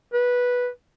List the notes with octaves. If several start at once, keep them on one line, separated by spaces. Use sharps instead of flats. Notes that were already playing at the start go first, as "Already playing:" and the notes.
B4